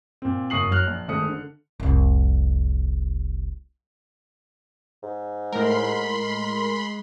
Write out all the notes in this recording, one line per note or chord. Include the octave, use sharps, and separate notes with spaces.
A#2 C4
F#1 C#6 D#6 C7 F#7
F#3 F6 F#6
A#1
G#1 G#3 A3 C5 D#6 C#7
D3
F1 C2
G#2
A2 G#3 A#4 B5 C6